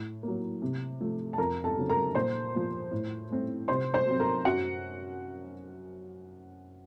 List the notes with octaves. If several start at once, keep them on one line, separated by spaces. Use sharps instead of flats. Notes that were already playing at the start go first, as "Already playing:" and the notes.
Already playing: A2
F#3 A#3
C3
F3 A3
A5
F2 A#4 A#5
A4 A5
C#3 F#3 C4
A#4 A#5
A#2 C5 C6
F3 A#3
A2
A3 C4
C3 C5 C6
C5 C6
F#3 C4
A#4 A#5
F#2 F#4 F#5